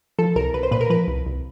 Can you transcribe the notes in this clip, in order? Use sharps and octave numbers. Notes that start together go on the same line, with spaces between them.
F3 A4
C2 A#4
C2 B4
C5
A#2 B4
A#4
F3 B4
C2
C2